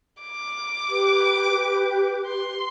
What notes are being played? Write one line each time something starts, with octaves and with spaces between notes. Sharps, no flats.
D6
G4 B4
C6